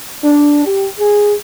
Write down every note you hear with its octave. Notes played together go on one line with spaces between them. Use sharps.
D4
G4
G#4